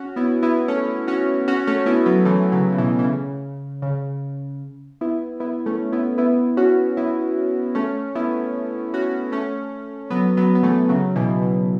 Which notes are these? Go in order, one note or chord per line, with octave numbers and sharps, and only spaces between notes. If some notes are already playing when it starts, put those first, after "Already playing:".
Already playing: C#4 F#4
B3 E4
B3 E4
A3 C#4
C#4 F#4
C#4 F#4
A3 C#4
B3 E4
F#3 B3
E3 A3
C#3 F#3
C#3
B2 E3
E3
C#3
C#3
B3 E4
B3 E4
A3 C#4
B3 E4
B3 E4
C#4 F#4
B3 E4
A3 C#4
B3 E4
C#4 F#4
A3 C#4
F#3 B3
F#3 B3
B3
E3 A3
C#3 F#3
B2 E3
B2